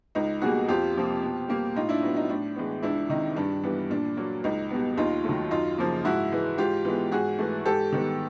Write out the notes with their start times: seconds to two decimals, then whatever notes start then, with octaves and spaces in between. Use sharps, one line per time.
0.15 C#2 D#4
0.41 B2 G3 A#3 F#4 G#4
0.68 F2 F4 G4
0.95 C3 F3 A#3
1.23 B2
1.48 G3 A#3
1.76 A2 D#4 F4
1.89 D4 E4
2.03 F#3 B3
2.16 D#4
2.29 A2 D4
2.56 E3 G#3 B3
2.83 C#2 D4 E4
3.10 C3 D#3 D#4
3.36 G2 D4
3.63 E3 G3 B3
3.90 A#2 D4
4.17 F#3 A#3
4.44 C#2 D#4
4.71 B2 G3 B3
4.97 D#2 D#4 F4
5.24 D#3 F#3 A3
5.51 F#2 D#4 F4
5.78 C#3 F3 A#3
6.05 G#2 E4 F#4
6.32 E3 G#3
6.58 G#2 F4 G4
6.85 E3 G#3 B3
7.12 G#2 F#4 G#4
7.39 E3 A3
7.65 G#2 G4 A4
7.92 D#3 G3 B3